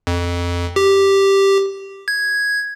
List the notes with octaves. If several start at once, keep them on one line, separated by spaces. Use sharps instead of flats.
F2
G4
G#6